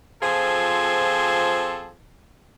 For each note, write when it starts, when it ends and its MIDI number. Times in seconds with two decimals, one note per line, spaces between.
0.22 1.94 53
0.22 1.94 60
0.22 1.94 65
0.22 1.94 68
0.22 1.94 69